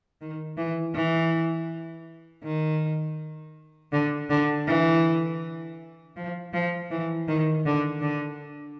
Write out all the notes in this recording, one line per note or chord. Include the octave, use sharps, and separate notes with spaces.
D#3
E3
E3
D#3
D3
D3
E3
F3
F3
E3
D#3
D3
D3